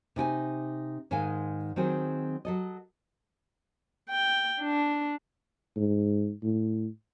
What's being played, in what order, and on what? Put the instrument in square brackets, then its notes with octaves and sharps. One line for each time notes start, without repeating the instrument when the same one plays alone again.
[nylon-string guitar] C3 D#4 G5 G#5
G#2 D#3 G#3 F5 G#5
D#3 F#3 C4 G#4
F#3 A4 D#5
[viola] G5
D4
[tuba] G#2
A2